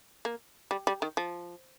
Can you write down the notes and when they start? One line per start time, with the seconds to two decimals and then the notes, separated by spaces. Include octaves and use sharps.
0.25 A#3
0.71 G3
0.87 G3
1.02 D#3
1.17 F3